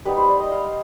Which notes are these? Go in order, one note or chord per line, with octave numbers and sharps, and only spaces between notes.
G3 B3 D#4 B4
C5
D5
D#5
F5